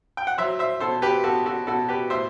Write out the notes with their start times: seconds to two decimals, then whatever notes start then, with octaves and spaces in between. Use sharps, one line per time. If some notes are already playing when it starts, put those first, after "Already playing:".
0.17 G5
0.27 F#5
0.38 F#3 C5 E5
0.59 C5 E5
0.80 B2 A4 C5
1.02 G4 B4
1.24 B3 F#4 A4
1.46 F#4 A4
1.67 B2 F#4 A4
1.89 G4 B4
2.10 A2 C5 E5